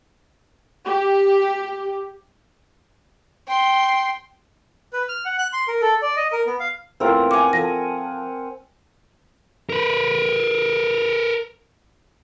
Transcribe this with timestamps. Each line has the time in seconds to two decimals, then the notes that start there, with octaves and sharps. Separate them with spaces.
0.85 G4
3.47 G5 C6
4.93 B4
5.09 F6
5.25 F#5
5.38 F#6
5.53 C6
5.68 A#4
5.81 A4
6.02 D5
6.16 D#5
6.32 A#4
6.47 B3
6.60 F5
7.00 E2 A3 C4 F4 A#4
7.31 F#5 G#5 D6
7.53 F3 A4 A#6
9.70 A#4 B4